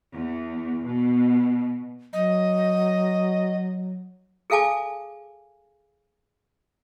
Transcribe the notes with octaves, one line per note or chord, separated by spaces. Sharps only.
E2
B2
F#3 D#5
G#4 A4 F5 G#5 A5 D6